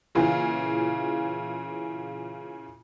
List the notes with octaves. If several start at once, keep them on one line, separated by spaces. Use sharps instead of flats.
A#2 C#3 E3 F4 G#4